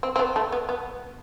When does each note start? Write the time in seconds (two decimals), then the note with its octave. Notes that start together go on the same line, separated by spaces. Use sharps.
0.03 C4
0.16 C4
0.19 B3
0.36 A3
0.52 B3
0.69 B3